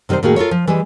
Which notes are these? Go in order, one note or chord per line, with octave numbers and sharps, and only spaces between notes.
C3 D#3 G3 A#4 C5
A2 D#3 A#3 F#4 G#4
F4 A4 A#4 C#5
F3
E3 G3 G#3